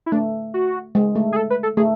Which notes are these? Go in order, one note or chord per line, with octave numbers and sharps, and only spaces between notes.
E4
A3 D4
F#4
G#3
A3
G#4
A4
B4
A4
A3 G#4